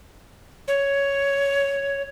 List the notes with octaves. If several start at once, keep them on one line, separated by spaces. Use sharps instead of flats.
C#5